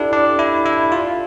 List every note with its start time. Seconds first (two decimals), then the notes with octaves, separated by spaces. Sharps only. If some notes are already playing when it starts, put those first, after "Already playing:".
Already playing: D4 E4 G4 A4
0.13 D4
0.39 E4
0.65 E4
0.92 F4